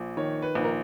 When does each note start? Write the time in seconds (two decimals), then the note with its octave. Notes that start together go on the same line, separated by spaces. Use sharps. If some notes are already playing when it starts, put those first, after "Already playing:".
Already playing: A#1
0.17 D#3 C#5
0.42 B4
0.55 A#1
0.64 A#4